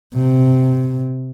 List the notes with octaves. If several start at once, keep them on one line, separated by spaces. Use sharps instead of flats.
C3